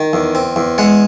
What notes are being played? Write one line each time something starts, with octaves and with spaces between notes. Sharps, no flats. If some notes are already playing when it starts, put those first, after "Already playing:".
Already playing: D#3
E2
C4
E2
G#3 F#5